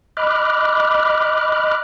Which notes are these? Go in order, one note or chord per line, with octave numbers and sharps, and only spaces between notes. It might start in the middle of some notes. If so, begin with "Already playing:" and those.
D#5 B5 D6 F6 F#6